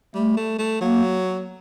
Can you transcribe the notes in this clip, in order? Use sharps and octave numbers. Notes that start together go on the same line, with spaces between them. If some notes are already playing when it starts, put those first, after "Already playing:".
G3 A3
A3
A3
F#3 A#3